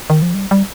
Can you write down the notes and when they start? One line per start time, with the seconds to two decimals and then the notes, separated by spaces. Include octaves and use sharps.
0.10 D#3
0.22 F3
0.34 G3
0.51 G3